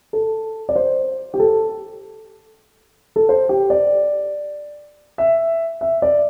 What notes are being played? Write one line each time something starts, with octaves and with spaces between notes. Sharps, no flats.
A4
D5
C5
G4
A4
A4
C5
G4
D5
E5
E5
D5